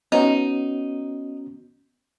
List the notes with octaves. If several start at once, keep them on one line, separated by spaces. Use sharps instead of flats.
B3 C#4 D#4 F#4